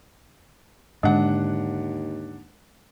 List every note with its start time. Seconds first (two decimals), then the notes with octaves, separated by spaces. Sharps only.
1.03 D#2 G#2 D3 G#3 D4 F#5